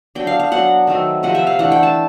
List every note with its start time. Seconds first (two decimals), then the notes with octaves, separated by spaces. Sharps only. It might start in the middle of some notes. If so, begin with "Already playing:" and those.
0.15 F#3 B3 D4 G5
0.27 F5
0.39 F5
0.51 F#3 B3 D4 F#5
0.87 D#3 F#3 A3 C4
1.23 C3 F3 A#3 F#5
1.35 E5
1.47 F5
1.59 E3 A3 D4 F#5
1.72 G5
1.83 A5